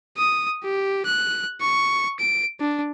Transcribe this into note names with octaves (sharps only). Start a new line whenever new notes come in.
D#6
G4
F#6
C#6
D7
D4